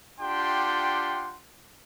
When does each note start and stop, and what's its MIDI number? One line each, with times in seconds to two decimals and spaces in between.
0.20 1.36 62
0.20 1.36 65
0.20 1.36 67
0.20 1.36 78
0.20 1.36 79
0.20 1.36 84